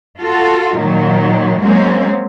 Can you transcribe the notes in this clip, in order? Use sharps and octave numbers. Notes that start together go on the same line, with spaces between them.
F4 F#4 A4
A#2 D#3 F#3
F#3 G#3 A#3 C4 C#4